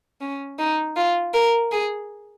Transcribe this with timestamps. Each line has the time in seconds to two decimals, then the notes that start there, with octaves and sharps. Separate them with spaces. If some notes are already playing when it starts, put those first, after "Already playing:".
0.21 C#4
0.59 D#4
0.96 F4
1.34 A#4
1.71 G#4